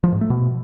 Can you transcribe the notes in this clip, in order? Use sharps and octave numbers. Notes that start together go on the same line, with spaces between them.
F3
G#2
A3
B2